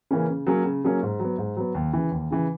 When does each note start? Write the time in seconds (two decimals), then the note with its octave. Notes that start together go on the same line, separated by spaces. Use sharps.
0.11 C#3 E3 A#3 C#4
0.29 C#3
0.47 F#3 A#3 C#4 G#4
0.65 C#3
0.84 F#3 A#3 C#4 G#4
1.03 G#2
1.20 F#3 B3
1.38 G#2
1.57 F#3 B3
1.75 D#2
1.93 C#3 E3
2.11 D#2
2.31 C#3 E3